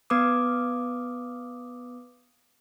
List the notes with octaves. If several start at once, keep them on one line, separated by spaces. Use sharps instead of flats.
B3 B4 D6 D#6